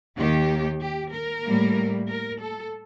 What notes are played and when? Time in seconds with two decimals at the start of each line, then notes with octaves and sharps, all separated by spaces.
0.17 D#2 D#3 A#3 G4
0.81 G4
1.14 A#4
1.45 A2 G3 A#3
2.10 A#4
2.41 A4